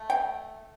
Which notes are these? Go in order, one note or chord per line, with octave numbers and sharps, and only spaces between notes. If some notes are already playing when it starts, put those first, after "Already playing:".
Already playing: A3
G5